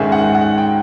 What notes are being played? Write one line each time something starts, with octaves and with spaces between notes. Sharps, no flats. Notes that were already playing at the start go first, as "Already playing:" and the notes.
Already playing: G#2 D#3 G#3 C#4 E5
F#5
F#5
G5